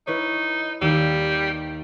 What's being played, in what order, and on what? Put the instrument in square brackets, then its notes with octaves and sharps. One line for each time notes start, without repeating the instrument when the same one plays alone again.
[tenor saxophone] D#4 [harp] E4 B4 C#5
[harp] D#2 E6 D#7 [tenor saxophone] G3